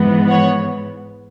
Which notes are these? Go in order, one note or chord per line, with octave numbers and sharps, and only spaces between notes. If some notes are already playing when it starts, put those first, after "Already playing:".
Already playing: G#2 E3 B3
C#5 F#5